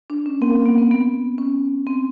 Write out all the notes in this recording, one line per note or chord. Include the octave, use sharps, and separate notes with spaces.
D4
C#4
A#3 C4
B3
C4
B3
C#4
C4